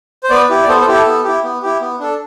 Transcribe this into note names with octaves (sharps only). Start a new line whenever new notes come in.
C5
B3 B4 D5
E4 G4
D5
B3 A4 C5
A4 C5
E4 G4
A4
B3
E4 G4
B3
E4 G4
B3
D4 A4